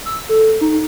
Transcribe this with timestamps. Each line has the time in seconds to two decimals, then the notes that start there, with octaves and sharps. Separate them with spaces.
0.06 E6
0.29 A4
0.61 D#4